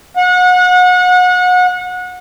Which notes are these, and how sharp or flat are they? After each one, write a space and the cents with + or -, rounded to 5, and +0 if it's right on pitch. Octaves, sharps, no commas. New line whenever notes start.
F#5 -30